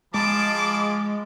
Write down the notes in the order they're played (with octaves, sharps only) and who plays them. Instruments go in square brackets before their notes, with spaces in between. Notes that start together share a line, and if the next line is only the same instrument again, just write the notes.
[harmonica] F3 G#4 B5 [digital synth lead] G#3 [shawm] A5 [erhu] D6